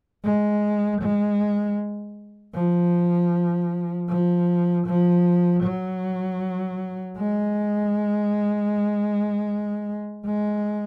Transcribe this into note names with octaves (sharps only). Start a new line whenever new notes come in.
G#3
G#3
F3
F3
F3
F#3
G#3
G#3